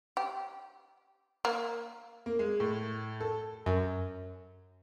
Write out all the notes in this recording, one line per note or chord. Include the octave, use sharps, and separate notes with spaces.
G4
A#3
A#3
G#3
A2
A4
F#2